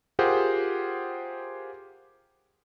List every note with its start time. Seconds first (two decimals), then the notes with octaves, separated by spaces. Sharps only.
0.19 F4 G4 G#4 A#4 C5 F#5